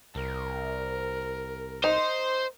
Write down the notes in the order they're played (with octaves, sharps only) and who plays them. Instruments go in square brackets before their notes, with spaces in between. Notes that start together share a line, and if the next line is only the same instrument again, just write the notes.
[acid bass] C2 [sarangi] A#4
[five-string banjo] D#4 [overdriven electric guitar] C5